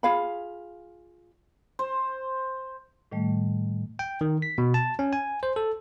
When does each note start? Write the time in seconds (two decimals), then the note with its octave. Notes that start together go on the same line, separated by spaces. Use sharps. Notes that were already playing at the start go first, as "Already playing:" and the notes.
0.03 F4 G#4 F5 B5
1.79 C5
3.12 A2 D#3 G3 A3
3.99 G5
4.21 D#3
4.42 B6
4.58 B2
4.74 A5
4.99 C#4
5.13 G#5
5.43 C5
5.56 A4